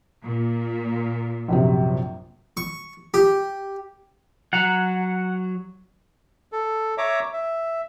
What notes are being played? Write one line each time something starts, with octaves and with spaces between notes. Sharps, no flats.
A#2
A#1 F#2 C3
C#6
G4
F#3 F#5 A#5
A4
C#5 E5 A#5 D6
E5